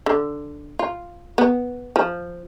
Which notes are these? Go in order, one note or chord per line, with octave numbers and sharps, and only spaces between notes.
D3
F4
B3
F3